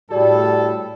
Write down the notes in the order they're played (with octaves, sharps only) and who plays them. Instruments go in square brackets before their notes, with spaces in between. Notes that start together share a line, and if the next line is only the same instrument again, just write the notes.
[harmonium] A2 G3 [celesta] F#4 G#4 D5 [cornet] A4